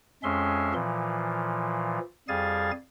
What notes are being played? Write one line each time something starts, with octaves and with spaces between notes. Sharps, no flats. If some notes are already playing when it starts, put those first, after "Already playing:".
F2 G#3 C#4 E5 C6
A#2 E3 F3
F2 G3 G#4 F5 G#5 A6